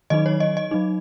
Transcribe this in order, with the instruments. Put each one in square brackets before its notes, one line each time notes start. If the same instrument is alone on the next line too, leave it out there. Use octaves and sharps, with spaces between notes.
[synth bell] D#3 F#3 D#4 D#5
C#5
D#5
D#5
F#3 D#4